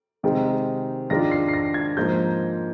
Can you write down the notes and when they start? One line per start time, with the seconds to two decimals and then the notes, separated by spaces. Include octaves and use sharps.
0.23 C3 D#3 G#3 C4 D#4
1.10 G#2 D#3 G#3 D4 F4 A#6
1.31 C7
1.48 C7
1.53 A#6
1.74 G#6
1.97 G#2 F3 A#3 D#4 G6